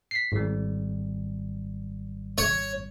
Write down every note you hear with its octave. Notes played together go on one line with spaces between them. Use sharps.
B6 C7
G#1 G3
C#5